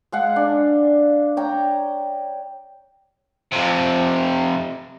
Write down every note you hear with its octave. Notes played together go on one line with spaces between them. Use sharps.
G#3 F5 F#5
D4
C#5 G5 A#5
F2 C3